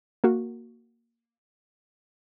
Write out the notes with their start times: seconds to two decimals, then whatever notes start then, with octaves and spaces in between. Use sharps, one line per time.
0.24 A#3 F#4